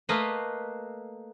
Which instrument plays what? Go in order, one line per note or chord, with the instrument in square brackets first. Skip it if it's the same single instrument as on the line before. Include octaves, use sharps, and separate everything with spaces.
[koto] A3 A#3 B4 D#5 F5